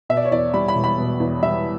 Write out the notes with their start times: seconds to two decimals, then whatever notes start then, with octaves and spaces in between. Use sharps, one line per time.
0.09 B2 E5
0.17 D5
0.25 C#5
0.31 E2 D5
0.54 G3 B5
0.68 B5
0.75 E1
0.84 B5
0.98 B2
1.20 E2
1.43 G3 E5